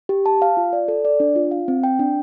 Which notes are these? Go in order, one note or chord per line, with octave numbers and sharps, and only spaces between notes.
G4
A5
F5
F4
D5
A4
D5
D4
F4
F5
C4
G5
D4